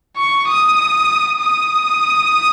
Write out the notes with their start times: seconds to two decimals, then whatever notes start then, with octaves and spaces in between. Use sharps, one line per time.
0.17 C#6
0.47 D#6
1.41 D#6